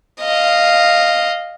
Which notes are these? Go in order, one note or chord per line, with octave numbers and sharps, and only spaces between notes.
D#5 F5